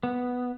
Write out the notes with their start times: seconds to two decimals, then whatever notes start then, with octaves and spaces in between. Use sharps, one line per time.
0.03 B3